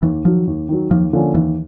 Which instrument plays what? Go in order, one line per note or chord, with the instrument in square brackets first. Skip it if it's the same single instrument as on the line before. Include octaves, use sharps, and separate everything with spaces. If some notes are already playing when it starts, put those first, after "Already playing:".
[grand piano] D#2 [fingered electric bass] E3
[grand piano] D#3 F#3 [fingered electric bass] F3
[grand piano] D#2
D#3 F#3
[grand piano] D#2 [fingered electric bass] F3
[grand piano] D3 F3 A#3 C#4
[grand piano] D#2 [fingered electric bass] E3